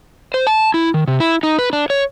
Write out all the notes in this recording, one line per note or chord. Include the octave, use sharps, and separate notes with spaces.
C5
A5
E4
D#3
C3
E4
D#4
B4
D4
C#5